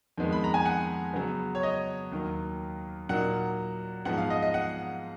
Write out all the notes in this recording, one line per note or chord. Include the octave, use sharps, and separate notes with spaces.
F2 D#3 G#3 B3
B5
A#5
G#5
F#5
C#3 F#3 B3
C#5
D#5
D#2 D#3 F#3
A#2 F#3 A#3 D#4 F#5
G#2 F3 B3 D#4 F#5
F5
D#5
D#5
F#5